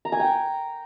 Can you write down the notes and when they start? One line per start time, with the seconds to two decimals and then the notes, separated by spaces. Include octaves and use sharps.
0.05 A#5
0.12 G#5
0.20 G5